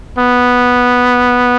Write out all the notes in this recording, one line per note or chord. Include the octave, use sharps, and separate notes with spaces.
B3